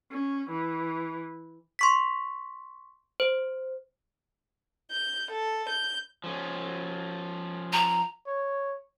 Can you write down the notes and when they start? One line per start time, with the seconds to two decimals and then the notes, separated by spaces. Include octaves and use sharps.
0.11 C#4
0.50 E3
1.79 C6 C#6 B6
3.20 C5
4.90 G6
5.30 A4
5.68 G6
6.24 F3 C#4
7.73 A#5
8.27 C#5